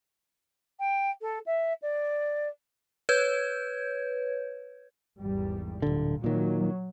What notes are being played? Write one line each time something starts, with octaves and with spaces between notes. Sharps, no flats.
G5
A4
E5
D5
B4 C#5 G6 G#6
G#1 E2 G3
D1 A#2 D3
A#2 D#3 F#3